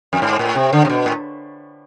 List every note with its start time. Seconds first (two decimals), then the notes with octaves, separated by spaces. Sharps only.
0.13 F2
0.22 G#2
0.39 A2
0.55 C3
0.73 D3
0.85 C3
0.89 B2
1.06 A2